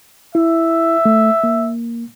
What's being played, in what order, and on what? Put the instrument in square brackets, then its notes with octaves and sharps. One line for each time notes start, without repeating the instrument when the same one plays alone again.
[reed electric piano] E4 [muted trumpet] E5
[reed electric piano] A3
A#3